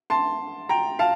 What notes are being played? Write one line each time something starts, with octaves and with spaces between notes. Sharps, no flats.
A5 C6
G5 A#5
F5 A5